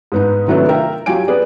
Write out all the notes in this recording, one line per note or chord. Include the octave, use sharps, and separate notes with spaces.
G#2 B3 D#4
C3 D#3 F#3 A3 B3 D4
F4 A#4 E5 G5
F#3 F4 G4 G#5 D7
B3 G#4 D5